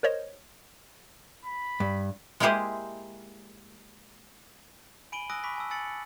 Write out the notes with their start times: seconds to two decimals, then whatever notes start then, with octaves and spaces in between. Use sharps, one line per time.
0.03 A#4 C5 C#5 D#5
1.45 B5
1.80 G2
2.40 G#3 A#3 E4 G4 G#4 C5
5.12 G#5 B5 D7 D#7 F#7 G7
5.30 G#5 D#6 E6 F#6 A#6 D7
5.44 B5 C#6 D6 B6
5.56 G#5 A5 E6
5.71 G#5 E6 A6 C#7 F#7
5.85 C#7